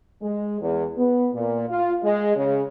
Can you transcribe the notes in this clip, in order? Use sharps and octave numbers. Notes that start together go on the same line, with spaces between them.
G#3
E2
B3
A#2
F4
G#3
C#3